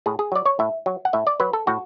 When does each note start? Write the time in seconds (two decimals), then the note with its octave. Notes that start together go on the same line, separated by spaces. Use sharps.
0.06 A2 G#4
0.19 G#4
0.32 F#3 D5
0.46 C#5
0.59 A2 E5
0.86 F#3
1.05 F#5
1.13 A2 E5
1.27 D5
1.40 F#3 B4
1.53 A4
1.67 A2 F#4